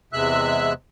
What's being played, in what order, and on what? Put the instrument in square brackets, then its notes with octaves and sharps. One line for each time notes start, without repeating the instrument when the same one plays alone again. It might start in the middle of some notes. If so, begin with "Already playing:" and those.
[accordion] E2 C3 G#3 E5 E6 F#6